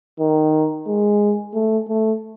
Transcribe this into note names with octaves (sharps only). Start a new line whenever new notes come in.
D#3
G#3
A3
A3